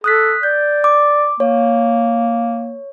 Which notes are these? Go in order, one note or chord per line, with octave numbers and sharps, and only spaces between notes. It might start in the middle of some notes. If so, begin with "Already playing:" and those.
A4 D#6 F#6 B6
D5 G6
D6
A#3 C#5